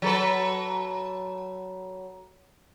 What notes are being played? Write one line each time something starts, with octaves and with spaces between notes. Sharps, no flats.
F#3 A4 B4